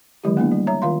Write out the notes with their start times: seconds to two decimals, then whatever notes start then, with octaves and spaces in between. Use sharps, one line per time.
0.24 D3 D#3 F#3 G#3 E4 G4
0.37 A#3 B3 D4 E4
0.52 G3
0.67 C#5 E5 A#5
0.82 D#3 F4 F5 C6